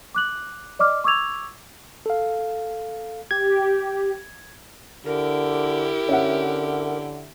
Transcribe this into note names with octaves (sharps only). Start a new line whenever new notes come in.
D6 F#6 F#7
D5 D#5 D6 F6
C#6 D6 E6 G#6 F7
A4 F5
G4 G#6
D3 E4 G4 A#4
D3 C#4 E5 F#5